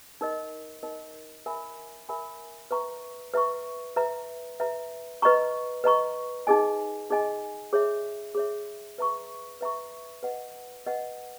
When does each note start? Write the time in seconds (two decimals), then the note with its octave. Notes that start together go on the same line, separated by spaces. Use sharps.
0.21 D#4 A#4 D#5
0.83 D#4 A#4 D#5
1.46 A#4 E5 G#5 B5
2.09 A#4 E5 G#5 B5
2.71 B4 E5 A#5 C#6
3.34 B4 E5 A#5 C#6
3.96 B4 E5 A#5
4.60 B4 E5 A#5
5.22 B4 D#5 A#5 C#6
5.84 B4 D#5 A#5 C#6
6.47 D#4 G#4 D#5 G#5
7.10 D#4 G#4 D#5 G#5
7.73 G#4 C#5 E5
8.35 G#4 C#5 E5
8.98 B4 E5 A#5 C#6
9.61 B4 E5 A#5 C#6
10.23 B4 D#5 F#5
10.86 B4 D#5 F#5